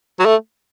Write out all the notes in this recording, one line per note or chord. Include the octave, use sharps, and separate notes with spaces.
F#3
A3